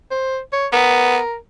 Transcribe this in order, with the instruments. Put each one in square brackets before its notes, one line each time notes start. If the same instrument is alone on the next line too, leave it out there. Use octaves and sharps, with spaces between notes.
[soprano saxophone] C5
C#5
[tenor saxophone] B3 [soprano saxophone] A#4